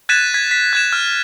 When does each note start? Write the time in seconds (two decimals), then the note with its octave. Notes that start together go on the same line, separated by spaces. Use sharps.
0.09 F#6 G#6 A6 B6 D#7 E7
0.34 G#6 B6
0.51 B6
0.73 F#6 G#6 E7
0.93 F6